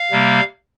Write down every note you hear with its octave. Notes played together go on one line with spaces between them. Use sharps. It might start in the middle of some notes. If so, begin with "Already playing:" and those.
Already playing: F5
C3 G3 A#3